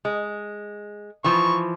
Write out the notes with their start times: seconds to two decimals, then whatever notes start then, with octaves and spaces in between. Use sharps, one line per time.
0.05 G#3
1.24 E3 F3 C#6